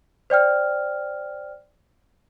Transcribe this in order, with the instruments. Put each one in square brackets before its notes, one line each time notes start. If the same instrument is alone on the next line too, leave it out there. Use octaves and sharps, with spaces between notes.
[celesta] C5 D5 G5 F6